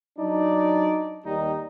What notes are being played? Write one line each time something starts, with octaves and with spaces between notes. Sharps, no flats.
F#3 D4 D#4 D5
D#2 G3 D#4